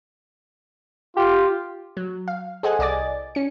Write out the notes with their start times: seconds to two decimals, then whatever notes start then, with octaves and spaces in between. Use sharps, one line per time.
1.16 F4 G4
1.97 F#3
2.28 F5
2.63 G#4 A4 C5 D#5 F#5 G#5
2.79 C2 D5 D#5 G#5 D6 A6
3.35 C#4 C#7